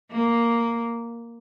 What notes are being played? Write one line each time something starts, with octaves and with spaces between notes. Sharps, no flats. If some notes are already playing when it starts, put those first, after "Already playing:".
A#3